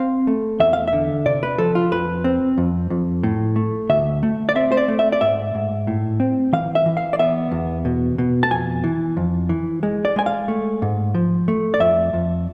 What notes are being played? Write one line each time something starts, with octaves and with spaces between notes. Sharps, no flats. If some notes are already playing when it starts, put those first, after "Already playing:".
Already playing: C4 F5
A3
E2 E5
F5
E5
D3
C3 D5
B4
F3 A4
F4
F2 B4
C4
F2
F2
A2
A3
D2 E5
A3
D5
C4 E5
C5
D5
A3
E5
D5
G#2 E5
G#2
A2
C4
E3 F5
E5
E3
F5
D5
B3 E5
E2
B2
B2
A5
F2 G#5
E3
F2
E3
G#3
D5
G#3 G#5
F5
A3
G#2
F3
A3
D5
F2 E5
F2